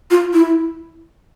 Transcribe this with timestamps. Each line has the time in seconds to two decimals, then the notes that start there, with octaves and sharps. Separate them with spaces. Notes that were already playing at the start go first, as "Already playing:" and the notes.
0.11 F4
0.34 E4